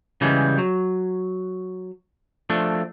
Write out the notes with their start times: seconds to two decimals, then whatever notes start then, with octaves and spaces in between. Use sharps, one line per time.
0.21 C#3 E3 G3 G#3
0.58 F#3
2.50 F3 A3 D4